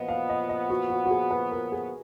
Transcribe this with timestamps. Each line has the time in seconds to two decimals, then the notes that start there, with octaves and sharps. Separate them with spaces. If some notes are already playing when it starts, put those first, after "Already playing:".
Already playing: A#2 F3 B3 D#5
0.09 F5
0.29 D#5
0.49 D#5
0.70 F#4
0.90 F#4
1.05 F#4
1.11 G#4
1.31 B4
1.51 A#4
1.72 G#4